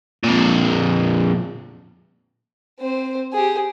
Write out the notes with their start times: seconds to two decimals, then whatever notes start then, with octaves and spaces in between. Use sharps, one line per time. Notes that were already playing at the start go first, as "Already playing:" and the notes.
0.23 F2 A#2
2.80 C4 C5
3.33 G4 G#4